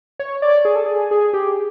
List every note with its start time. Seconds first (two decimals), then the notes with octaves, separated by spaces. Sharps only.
0.19 C#5
0.42 D5
0.65 G#4
0.76 A4
0.86 G#4
1.11 G#4
1.33 G4